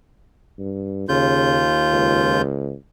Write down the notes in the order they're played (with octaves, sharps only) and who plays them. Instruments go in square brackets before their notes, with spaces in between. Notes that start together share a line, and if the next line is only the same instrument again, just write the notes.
[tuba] G2
[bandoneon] D#2 F4 G6 [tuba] C#3
[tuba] C#2